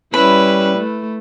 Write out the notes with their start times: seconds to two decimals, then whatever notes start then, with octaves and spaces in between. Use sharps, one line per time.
0.14 G3 C#4 E4 B4 B5
0.77 A3